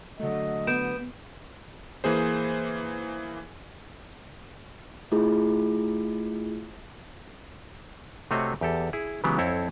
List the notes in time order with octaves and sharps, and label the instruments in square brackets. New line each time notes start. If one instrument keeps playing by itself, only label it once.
[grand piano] D3 F#3 A3 [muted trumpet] D#5
[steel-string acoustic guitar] B3 [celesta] G6 D7 E7
[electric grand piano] E3 A#3 G#4 C5
[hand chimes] A3 E4 F4 G#4
[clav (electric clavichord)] C3 A3 C4 F#4 C#5 D#5
E2 G4 A4
E4 G#4
C#3 E3 F#3 G#3 B3 G4
F2 C4 E4 A4 C#5